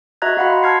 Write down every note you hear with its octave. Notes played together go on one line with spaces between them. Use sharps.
F#4 D#5 E5 A#5 F#6 G#6
F#4 F5 F#5 A#5 B5
B5 C6
A5 F6 G#6 C7